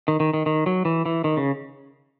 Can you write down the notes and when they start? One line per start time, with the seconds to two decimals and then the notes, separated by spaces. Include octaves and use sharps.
0.08 D#3
0.20 D#3
0.33 D#3
0.46 D#3
0.66 F#3
0.85 E3
1.06 E3
1.24 D#3
1.37 C#3